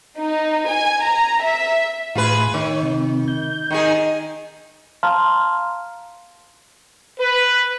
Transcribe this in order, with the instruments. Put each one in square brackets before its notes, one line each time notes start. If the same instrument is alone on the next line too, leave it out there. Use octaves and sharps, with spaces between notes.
[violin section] D#4
G#5
A#5
E5
[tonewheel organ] A2 [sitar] F4 G#4 B4
[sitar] D#3 [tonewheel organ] C#5
[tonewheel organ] C3
G6
[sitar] D#3 D#4 G#4
[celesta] F5 A5 A#5 C6 F6
[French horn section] B4